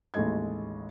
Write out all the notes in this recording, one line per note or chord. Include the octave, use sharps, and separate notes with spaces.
A1 D#2 G#3 A4 D#5 G#6